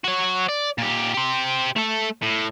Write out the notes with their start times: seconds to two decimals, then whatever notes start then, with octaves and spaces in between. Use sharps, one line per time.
0.04 F#4 C#5
0.49 D5
0.78 A#2 G4
1.14 G4 C5
1.76 A3 A4
2.22 A2